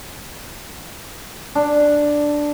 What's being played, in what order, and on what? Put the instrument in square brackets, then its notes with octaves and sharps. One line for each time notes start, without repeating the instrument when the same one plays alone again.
[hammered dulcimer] D4